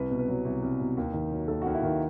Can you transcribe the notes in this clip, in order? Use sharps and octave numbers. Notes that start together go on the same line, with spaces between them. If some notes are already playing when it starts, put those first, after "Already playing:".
Already playing: C2 B4
B2
B4
F#3
C2
C2
B2
D#2
D#3
F#3
D#2 A4
D#2 F#4
E4
D#3 D#4